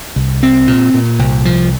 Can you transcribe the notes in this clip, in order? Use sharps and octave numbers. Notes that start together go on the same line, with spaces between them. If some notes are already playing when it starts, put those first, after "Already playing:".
C2
C4
A#2
A#2
C2
F3